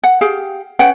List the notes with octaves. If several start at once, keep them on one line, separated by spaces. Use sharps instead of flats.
F#5
G4 G#4 F5 G5
C#4 B4 F#5 G5